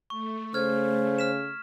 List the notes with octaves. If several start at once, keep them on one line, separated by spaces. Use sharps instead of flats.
A3 C#6
C#3 C5 F6 G#6
F6 B6 E7